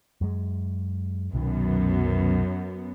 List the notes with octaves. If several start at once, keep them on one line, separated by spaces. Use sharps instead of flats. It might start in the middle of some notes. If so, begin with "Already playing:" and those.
F#2 G#3
C2 F#2 B2 D#3 B3